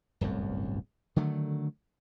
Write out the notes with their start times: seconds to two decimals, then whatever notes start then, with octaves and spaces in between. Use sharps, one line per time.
0.21 D1 G1 C2 F#2
1.16 D3 D#3 F#3 A3